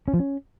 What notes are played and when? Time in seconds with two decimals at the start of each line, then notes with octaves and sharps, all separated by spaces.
0.08 C#4
0.14 F3
0.19 C#4